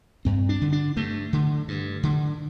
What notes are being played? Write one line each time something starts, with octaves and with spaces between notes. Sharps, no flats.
G2 C4
D4
D3
D4
G2 A3
D3
G2
D3